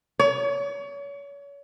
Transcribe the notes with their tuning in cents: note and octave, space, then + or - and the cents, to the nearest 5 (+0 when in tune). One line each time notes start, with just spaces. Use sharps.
C#5 +35